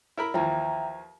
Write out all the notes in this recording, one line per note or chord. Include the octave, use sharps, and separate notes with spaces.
E4 A#4 B5
D#2 E3 F3 E5 G5 A#5